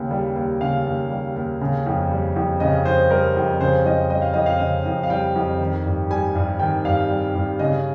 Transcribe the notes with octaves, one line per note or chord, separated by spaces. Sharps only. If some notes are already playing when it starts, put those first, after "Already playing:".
Already playing: D#2 C#3
G3
D#2
C#3 F5
D#2
G3
D#2
C#3
F2
G3
F2
C#3 D#5
F2 C5
G3 A#4
F2
C#3 C5
F2 D#5
G3 D#5
F5
F2 D#5
F5
C#3 D#5
F2
F5
G3 G5
F2
D#3
G2
G3 G#5
G2
D#3 G5
G2 F5
G3
G2
C#3 D#5